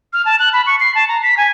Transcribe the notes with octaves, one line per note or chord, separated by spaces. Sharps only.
F6
A5
F#6
B5
C#6
C7
A5
A#5
B6
G#5